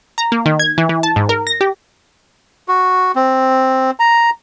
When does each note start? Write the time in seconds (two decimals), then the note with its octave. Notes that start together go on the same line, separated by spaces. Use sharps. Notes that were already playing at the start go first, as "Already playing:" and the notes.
0.18 A#5
0.32 A#3
0.46 D#3
0.60 G#6
0.78 E3
0.89 E3
1.03 A5
1.16 G#2
1.29 A#4
1.47 A#6
1.61 G4
2.68 F#4
3.16 C4
4.00 A#5